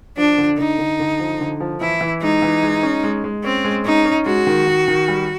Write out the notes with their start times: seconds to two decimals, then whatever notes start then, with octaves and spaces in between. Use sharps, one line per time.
0.17 F3 D4
0.38 D3
0.58 D3 D#4
0.79 D3
1.00 D3
1.20 F3
1.40 D3
1.60 F3
1.81 E3 E4
2.01 E3
2.22 G#3 D#4
2.42 E3
2.63 G#3
2.83 C#4
3.03 G#3
3.24 G#3
3.44 C4 C#4
3.65 G#3
3.85 C#4 D#4
4.05 C#4
4.26 G#3 F#4
4.47 D#3
4.67 D#3
4.88 D#3
5.08 G3